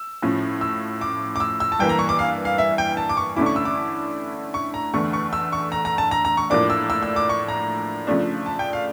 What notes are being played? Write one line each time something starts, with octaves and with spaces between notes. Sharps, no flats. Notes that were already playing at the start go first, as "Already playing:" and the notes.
Already playing: E6
A2 F3 C#4
E6
D6
D6
E6
E6
A5
G2 E3 A#3 G5
A#5
C#6
D6
F5
F5
E5
G5
A5
D6
C#6
D3 A3 C#4 E4 D6
C#6
E6
D6
C#6
A#5
E2 D3 A3 C#6
C#6
E6
C#6
A#5
A#5
A5
A#5
A#5
C#6
A2 F3 A#3 D4 D6
E6
E6
E6
D6
C#6
A#5
C#3 F3 A3 D4
A5
G5
F5